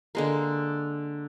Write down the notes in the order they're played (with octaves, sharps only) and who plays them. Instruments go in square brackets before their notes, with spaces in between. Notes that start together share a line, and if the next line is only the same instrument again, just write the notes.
[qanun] D3 G#3 A#3